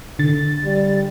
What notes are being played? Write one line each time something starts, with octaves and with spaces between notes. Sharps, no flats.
D3 A6
G3